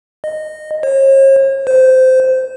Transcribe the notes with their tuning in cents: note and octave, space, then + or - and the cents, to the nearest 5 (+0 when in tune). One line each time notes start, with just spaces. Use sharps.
D#5 -15
C#5 -45
C5 -15